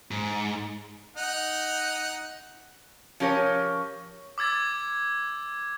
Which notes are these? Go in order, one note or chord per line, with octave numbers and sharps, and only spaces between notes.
G#2
D#4 F#5
F3 C#4 G4 A#4 C#5
D6 E6 G#6 A6